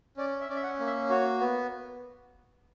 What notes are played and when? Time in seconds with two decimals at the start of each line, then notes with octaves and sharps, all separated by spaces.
0.17 C#4 D5
0.41 E5
0.49 C#4 D5
0.56 E5
0.63 F#5
0.79 A#3
0.87 E5
1.10 F#4 C#5
1.40 B3